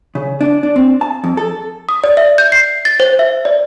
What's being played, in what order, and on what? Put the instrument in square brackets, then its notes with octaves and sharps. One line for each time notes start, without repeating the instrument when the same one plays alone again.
[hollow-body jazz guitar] C#3
D4
D4
C4
A5
F2
A4
[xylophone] D#6
D5
E5
G6
C7
A6
C5
E5
D5